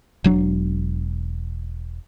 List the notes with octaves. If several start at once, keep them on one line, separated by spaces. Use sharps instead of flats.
E1 F#3 D4